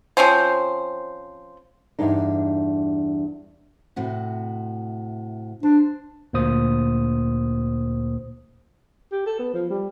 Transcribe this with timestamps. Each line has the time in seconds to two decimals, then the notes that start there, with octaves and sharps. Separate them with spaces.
0.17 F3 C4 C#4 C5
1.99 E2 G2 D4 D#4
3.96 A2 C3 F#4
5.63 D4 C5
6.33 D2 A#2 A#3 C5 D#6
9.12 G4
9.26 A4
9.39 B3
9.54 F3
9.70 G3